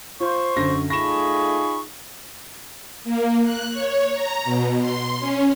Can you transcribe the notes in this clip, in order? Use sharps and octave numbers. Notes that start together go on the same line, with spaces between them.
F4 C5 C#6
F#2 D3 A#6
A3 D#4 F4 G#4 B5 C#6 A#6 E7
A#3
F#6
C#5
A#5
B2
C6
C#4